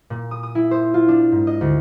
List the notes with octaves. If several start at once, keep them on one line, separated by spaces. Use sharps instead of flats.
A#2
D#6
D#6
E4
C5
F4
D4
G#2
D#5
D2